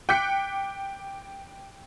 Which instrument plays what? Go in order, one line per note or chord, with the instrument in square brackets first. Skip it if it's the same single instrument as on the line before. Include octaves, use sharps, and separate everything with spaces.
[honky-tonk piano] G5 D6 F#6 G6 B6 C#7